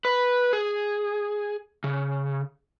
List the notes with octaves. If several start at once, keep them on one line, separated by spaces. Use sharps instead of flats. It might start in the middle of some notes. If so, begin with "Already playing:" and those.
B4
G#4
C#3